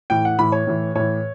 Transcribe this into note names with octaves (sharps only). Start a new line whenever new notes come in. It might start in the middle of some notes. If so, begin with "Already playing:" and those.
A2 E3 G5
F#5
A2 E3 B5
C#5
A2 E3
A2 E3 C#5